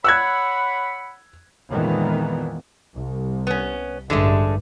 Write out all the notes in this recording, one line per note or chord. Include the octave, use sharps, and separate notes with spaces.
C#5 F#5 B5 E6 F#6 G#6
F2 A#2 D#3 E3 G#3 B3
C2
B3 C#4
A1 G2 D3 G#3 A3